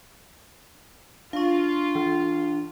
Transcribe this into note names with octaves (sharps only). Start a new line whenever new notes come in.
D4 F4 F5 C#6
E3